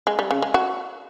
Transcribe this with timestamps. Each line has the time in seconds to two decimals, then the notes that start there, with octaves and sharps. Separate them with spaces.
0.07 G#3
0.19 G3
0.31 C#3
0.42 G#3
0.54 F#4